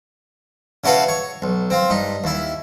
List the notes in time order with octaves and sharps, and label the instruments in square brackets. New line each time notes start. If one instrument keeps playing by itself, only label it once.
[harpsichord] C#3 E4 F#4 A4 B4 F5
C#5
B1
C4 F4
G2 D#4
D#2 E4